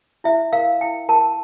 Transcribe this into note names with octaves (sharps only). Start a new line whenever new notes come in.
E4 E5
A#4 F5
E4 G5
A#4 A5